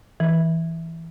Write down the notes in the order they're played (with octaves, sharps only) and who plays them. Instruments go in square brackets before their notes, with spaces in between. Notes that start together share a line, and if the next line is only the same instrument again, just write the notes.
[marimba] E3